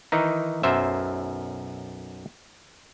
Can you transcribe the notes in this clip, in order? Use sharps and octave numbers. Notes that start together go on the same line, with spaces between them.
D#3 E3 D#4
B1 F#2 C5 E5